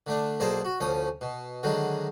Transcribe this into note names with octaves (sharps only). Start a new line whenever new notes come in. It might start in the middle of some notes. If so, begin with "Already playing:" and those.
D3 A3 D4
B1 A#3 G#4 C5 D5 A5
F#4
D2 F3 C#4 D#6
B2
D3 D#3 F#3 G#3